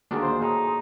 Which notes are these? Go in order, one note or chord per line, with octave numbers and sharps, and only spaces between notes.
D2 D#3 A#3 D4 F#4 G#4
C5
A2 D#4 G#4